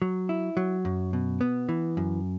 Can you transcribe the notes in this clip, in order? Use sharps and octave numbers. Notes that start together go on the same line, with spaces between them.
F#3
E4
F#3
F#2
B2
B3
E3
F#2